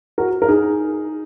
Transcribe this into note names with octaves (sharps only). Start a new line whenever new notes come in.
F#4 A#4
A#4
D#4 G#4